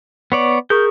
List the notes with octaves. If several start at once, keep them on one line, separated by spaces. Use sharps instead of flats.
B3 C#5 D5
G#4 A#4 C#6 G6